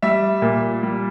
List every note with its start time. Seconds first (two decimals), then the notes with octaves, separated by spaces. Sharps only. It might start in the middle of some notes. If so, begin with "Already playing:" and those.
0.02 G3 E5
0.42 A#2
0.83 G3